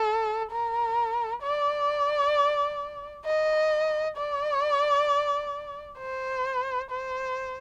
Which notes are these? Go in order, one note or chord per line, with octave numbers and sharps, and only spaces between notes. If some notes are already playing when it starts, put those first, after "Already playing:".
Already playing: A4
A#4
D5
D#5
D5
C5
C5